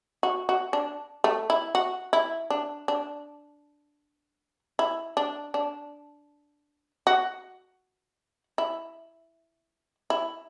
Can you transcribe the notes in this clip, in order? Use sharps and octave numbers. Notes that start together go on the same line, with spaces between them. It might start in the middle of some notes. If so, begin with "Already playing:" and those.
F#4
F#4
D4
A3
E4
F#4
E4
D4
D4
E4
D4
D4
F#4
E4
E4